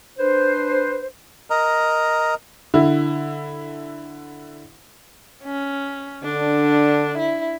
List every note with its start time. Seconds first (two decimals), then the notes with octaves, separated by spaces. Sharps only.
0.19 D4 B4 C5
1.50 A#4 D#5 A#5
2.74 D3 E4
5.44 C#4
6.24 D3 D4
7.19 E4